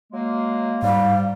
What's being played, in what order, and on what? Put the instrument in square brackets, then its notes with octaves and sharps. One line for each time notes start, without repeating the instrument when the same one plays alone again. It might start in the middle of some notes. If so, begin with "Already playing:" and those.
[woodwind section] F#3 G#3 A#3
[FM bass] G#2 [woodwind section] G3 [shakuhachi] F5